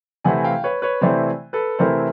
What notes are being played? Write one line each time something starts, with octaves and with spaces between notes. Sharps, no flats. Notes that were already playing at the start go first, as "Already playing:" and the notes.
C3 E3 A3 C4 E4 F#5 G#5
F5 G5
B4 C#5
B4 C#5
C3 E3 A3 C4 E4 C5 D5
A4 B4
C3 E3 A3 C4 E4 A#4 C5